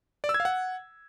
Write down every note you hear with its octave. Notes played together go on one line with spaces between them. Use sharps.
D5
E6
G#6
F5
F#5